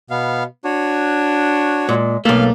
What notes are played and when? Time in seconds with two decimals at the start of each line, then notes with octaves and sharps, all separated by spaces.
0.10 B2 B3 F5
0.65 D4 F#4 C#5
1.89 A#2 G#3
2.25 B1 A3 A#3 A4 F5